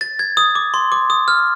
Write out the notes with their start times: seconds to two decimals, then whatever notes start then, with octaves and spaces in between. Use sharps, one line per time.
0.01 A6
0.19 G#6
0.37 D#6
0.55 D6
0.74 C6
0.92 D6
1.10 D#6
1.28 F6